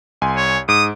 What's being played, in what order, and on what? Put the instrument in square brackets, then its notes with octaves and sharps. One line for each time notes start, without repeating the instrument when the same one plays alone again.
[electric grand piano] C2 G#5 C6
[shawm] C#5
[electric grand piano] G#2 D7 [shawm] D#6